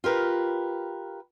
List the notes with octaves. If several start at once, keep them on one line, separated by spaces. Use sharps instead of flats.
F4 G4 A#4 B4